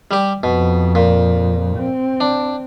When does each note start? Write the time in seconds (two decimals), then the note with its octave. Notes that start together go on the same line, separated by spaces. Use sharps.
0.11 G3 G4
0.43 F2 B2
0.95 A#2
1.77 C4
2.21 D4